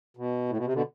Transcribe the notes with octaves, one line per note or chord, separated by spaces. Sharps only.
B2
A2
B2
C3
B2 D3